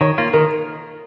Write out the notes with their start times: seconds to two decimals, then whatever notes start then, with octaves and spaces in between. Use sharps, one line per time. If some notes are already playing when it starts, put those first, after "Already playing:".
0.01 D#3 C#5
0.18 A#3 F4
0.33 D#3 A#4